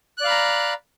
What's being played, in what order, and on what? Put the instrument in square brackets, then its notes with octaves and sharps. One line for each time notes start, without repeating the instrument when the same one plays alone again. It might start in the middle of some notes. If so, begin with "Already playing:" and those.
[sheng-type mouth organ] F#6
D5
F5
B5
A#5